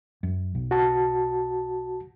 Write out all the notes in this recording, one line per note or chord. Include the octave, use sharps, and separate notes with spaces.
F#2
B1
F#4 A5